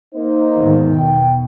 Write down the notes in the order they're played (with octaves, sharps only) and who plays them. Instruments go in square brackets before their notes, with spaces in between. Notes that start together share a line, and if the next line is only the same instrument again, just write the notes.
[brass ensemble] A#3 D#4 C5
[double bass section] E2 G#2 D#3
[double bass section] B2 [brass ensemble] G5